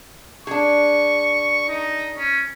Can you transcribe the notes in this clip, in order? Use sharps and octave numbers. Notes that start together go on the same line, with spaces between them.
D4 G#4 C#6
D#4
C#4